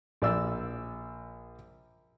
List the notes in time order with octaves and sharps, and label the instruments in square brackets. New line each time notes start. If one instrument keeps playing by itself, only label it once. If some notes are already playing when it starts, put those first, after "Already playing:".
[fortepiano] A#1 D5 E6